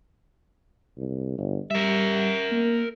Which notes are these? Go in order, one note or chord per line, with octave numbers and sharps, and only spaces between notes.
C2
G1
G3 A#4 E5
A#3